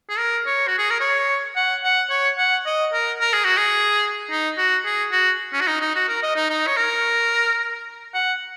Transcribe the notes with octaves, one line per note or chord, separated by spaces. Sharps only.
G#4
A#4
C#5
F#4
G#4
A#4
C#5
F#5
F#5
C#5
F#5
D#5
A#4
A#4
G#4
F#4
G#4
D#4
F#4
G#4
F#4
C#4
F#4
D#4
D#4
F#4
A#4
D#5
D#4
D#4
C#5
A#4
F#5